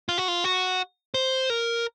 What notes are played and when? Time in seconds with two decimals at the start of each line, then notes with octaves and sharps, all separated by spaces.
0.09 F4
0.18 F#4
0.28 F4
0.44 F#4
1.14 C5
1.50 A#4